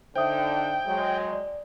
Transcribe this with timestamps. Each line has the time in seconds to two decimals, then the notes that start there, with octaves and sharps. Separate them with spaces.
0.16 D3 D#4 C5 E5 G5 D#6
0.87 F#3 G#3
1.33 D5